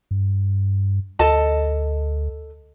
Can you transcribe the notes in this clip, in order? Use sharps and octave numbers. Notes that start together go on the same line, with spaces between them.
G2
D2 A4 D#5 A5